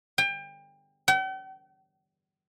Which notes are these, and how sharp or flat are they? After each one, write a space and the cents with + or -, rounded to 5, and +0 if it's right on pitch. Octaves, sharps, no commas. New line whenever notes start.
G5 +30
G5 -45